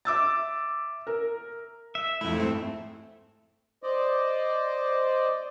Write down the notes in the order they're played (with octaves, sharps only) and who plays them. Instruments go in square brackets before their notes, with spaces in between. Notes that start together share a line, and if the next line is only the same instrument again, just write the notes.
[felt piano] E5 D6 E6 A6
A#4
[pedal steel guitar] E5
[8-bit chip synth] F2 E4 [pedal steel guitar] A3
[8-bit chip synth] G#2 C4
[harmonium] C5 D5 D#5